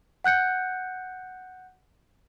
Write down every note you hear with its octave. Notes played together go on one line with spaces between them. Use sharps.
F#5 F#6 G6 C#7